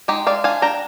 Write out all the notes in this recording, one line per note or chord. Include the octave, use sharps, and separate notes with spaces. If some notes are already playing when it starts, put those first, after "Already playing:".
G#3 D#4 G4
G#3 D5 F5
D4 F5 G#5
D4 G5 A#5